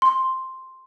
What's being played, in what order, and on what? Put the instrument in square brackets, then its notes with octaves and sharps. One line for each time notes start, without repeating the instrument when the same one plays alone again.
[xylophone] C6